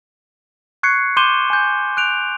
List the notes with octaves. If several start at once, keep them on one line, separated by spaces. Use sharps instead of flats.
C#6 F#6 G#6 C7 C#7
C6 D6 G6 D#7 E7 G7
G#5 G6
F#6 D7 F7